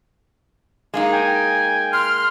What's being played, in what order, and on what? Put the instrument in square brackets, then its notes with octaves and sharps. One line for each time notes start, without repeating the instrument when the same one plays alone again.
[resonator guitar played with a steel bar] G#3 A#3 D#4
[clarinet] G5 [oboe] G#5
[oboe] C6 [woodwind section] F6